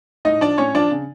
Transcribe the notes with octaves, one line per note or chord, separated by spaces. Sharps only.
A2 D#4 D#5
F3 D4 D5
A2 C#4 C#5
F3 D4 D5
C#3